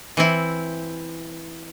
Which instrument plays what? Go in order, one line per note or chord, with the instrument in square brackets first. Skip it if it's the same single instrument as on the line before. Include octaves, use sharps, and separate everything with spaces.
[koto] E3 C4 E4